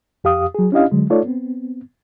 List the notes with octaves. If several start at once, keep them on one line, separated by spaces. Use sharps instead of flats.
F2 G4 F5 D#6
F#3 G#4
C#4 D4 E4 G4 D#5 F5
D3 F#3 G#3
A3 D#4 F4 A4 C#5 D5
B3 C4